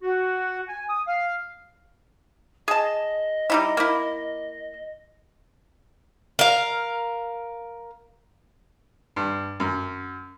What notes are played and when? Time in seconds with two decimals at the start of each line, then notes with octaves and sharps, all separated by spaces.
0.02 F#4
0.68 G#5
0.89 D#6
1.07 F5
2.68 G#4 D#5 A5
3.50 G3 D#4 E4
3.77 A#3 E4
6.39 A#4 F5
9.16 G2
9.60 F#2